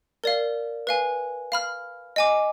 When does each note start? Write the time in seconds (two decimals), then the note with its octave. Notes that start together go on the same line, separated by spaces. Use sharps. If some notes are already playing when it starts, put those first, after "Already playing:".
0.24 A#4 D5 F5
0.87 B4 F5 G#5
1.52 F5 B5 F6
2.16 D#5 G#5 D6